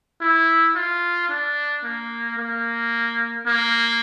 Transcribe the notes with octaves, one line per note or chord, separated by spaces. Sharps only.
E4
F4
D4
A#3
A#3
A#3